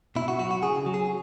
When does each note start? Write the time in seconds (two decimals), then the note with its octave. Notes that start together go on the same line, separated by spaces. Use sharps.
0.16 B2 E4
0.28 F#4
0.39 F#3 F#4
0.51 F#4
0.63 C#3 G#4
0.86 F#3
0.94 G#4